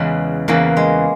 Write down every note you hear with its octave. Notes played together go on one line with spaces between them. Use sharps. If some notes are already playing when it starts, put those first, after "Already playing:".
Already playing: E2 C#3 E3 G#3
E2 C#3 E3 A#3
G#3